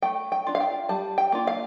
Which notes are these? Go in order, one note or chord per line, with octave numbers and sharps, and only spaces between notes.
A3 G5
G5
D4 F4
F5
G5
G3 A5
G5
A#3 D4 F4
F5